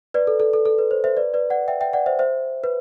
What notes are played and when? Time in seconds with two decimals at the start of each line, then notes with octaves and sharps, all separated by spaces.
0.14 B4 D5
0.27 A4
0.40 A4
0.53 A4
0.65 A4
0.78 B4
0.91 C5
1.04 C5 E5
1.17 B4 D5
1.34 B4 D5
1.50 D5 F#5
1.68 E5 G5
1.81 E5 G5
1.93 D5 F#5
2.06 C5 E5
2.19 C5 E5
2.64 B4